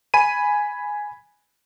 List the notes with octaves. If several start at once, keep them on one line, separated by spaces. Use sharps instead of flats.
G#5 B5 D#7